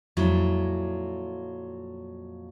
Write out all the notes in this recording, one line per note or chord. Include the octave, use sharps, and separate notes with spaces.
F2 A#2 F#3 G#3 E4